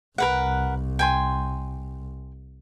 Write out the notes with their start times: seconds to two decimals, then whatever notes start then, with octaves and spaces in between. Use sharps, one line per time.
0.18 C2 A#4 B4 F#5
0.99 G5 G#5 C6